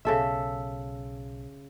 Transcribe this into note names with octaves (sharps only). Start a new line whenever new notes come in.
B1 C#3 A4 E5